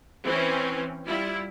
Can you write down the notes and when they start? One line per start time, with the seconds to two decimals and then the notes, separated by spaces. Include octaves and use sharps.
0.24 E3 C4 C#4
1.06 G3 E4 F4